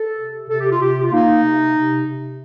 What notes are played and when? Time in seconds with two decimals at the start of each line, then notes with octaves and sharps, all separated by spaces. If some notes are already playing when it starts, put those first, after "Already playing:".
Already playing: A4
0.17 C3
0.48 C3 A4
0.59 G4
0.69 F4
0.79 C3 G4
1.03 F4
1.12 A#3 D#4
1.44 C3
1.76 C3
2.07 C3